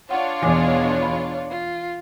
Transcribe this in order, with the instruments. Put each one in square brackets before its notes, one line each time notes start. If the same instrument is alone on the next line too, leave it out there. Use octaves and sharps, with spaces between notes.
[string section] D4 F4 C#5 [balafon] F#5
[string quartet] E2 B2 G#3 [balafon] E3 G#5 D6
[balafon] B5
[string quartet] F4